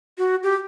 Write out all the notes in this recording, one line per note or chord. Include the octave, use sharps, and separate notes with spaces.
F#4
G4